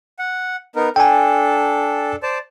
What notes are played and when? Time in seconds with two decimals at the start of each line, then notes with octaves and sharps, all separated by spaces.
0.19 F#5
0.76 B3 D#4 A#4
0.96 D4 A4 G5 G#5
2.23 C5 D5 A5